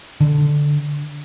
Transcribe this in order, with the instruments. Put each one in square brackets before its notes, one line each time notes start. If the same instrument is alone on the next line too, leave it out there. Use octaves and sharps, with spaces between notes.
[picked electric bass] D3